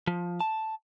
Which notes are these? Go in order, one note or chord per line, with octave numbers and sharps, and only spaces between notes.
F3
A5